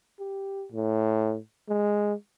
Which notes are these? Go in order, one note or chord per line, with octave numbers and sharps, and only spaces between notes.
G4
A2
G#3